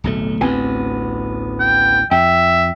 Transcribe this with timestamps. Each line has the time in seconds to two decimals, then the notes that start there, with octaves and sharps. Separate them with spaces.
0.04 D1 B1 A3
0.41 A1 D2 B3 C4 G#5
1.60 G5
2.11 F2 E5 G5